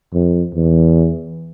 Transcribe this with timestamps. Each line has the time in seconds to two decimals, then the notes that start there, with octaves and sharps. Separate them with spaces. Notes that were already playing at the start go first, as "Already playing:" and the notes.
0.13 F2
0.54 E2